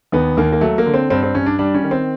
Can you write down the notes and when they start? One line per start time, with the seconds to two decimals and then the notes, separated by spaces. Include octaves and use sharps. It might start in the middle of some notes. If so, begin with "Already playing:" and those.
0.12 D#2 B3
0.37 D#2 A#3
0.52 A#3
0.61 F#3 A3
0.78 A#3
0.86 D3
0.94 C4
1.10 G2 C4
1.23 C4
1.34 G2 C#4
1.46 D4
1.59 G3 D4
1.75 C#4
1.83 D#3
1.91 C4